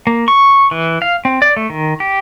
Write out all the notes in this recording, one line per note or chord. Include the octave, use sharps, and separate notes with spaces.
A#3
C#6
E3
F5
C4
D5
A3
D#3
G4